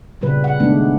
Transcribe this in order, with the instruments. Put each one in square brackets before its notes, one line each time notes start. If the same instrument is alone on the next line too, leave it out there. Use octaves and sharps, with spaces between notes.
[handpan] A#2 C#3 G3 B4
F#5
D#3 G#3 A3 B3 D4